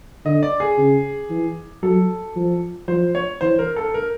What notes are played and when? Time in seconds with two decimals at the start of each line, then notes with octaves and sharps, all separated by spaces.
0.25 D3 D#5
0.43 D5
0.60 G#4
0.78 C#3
1.30 E3
1.83 F#3 A4
2.36 F3
2.88 F3 C5
3.15 C#5
3.41 E3 C5
3.59 A#4
3.76 A4
3.94 A#4